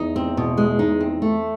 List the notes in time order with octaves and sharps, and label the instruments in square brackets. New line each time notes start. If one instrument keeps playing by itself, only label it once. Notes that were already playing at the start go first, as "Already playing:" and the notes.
Already playing: [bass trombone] E2 [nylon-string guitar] D#4
[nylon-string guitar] C4
B2
G#3
D#4
C4
A3